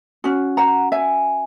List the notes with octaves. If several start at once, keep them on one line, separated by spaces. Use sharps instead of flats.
C#4 F#4
F#5 A#5
E5 G#5